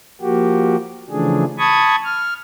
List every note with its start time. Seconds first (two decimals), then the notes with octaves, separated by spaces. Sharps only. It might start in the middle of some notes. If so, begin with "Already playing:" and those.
0.21 F3 A#3 F#4 G4
1.10 C#3 E3 F3 A3 D4 G#4
1.59 A5 B5 C#6 D#6 G#6
2.05 F6